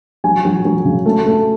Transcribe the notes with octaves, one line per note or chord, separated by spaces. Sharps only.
F#3 G#5
F#3
F#3
C#3
A3
A3